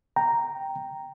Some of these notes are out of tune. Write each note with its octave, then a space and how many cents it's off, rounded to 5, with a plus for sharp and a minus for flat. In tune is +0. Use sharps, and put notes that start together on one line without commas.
G5 +0 A#5 +0